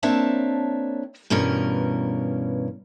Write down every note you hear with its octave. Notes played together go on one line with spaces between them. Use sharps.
A#3 C4 D4 C#5 E5 A5
G2 B2 E3 C#4 A#4